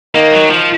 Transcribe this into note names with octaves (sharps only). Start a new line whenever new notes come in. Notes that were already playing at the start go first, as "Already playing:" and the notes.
D#3 A#3
F#3
F3